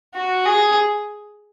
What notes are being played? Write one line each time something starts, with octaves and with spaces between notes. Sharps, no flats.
F#4
G#4